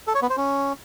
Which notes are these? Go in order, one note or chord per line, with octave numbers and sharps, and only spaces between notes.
A4
C#5
B3
C5
C#4